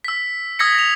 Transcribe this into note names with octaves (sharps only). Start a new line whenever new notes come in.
E6 B6
D#6 E6 G#6 A#6 B6 C#7
A#6 F7